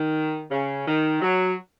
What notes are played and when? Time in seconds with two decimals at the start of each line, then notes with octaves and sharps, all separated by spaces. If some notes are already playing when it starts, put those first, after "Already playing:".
Already playing: D#3
0.51 C#3
0.86 D#3
1.21 F#3